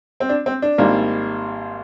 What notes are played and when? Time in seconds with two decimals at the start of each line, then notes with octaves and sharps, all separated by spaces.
0.20 C4
0.29 D4
0.46 C4
0.62 D4
0.78 G#1 G#2 G3 A#3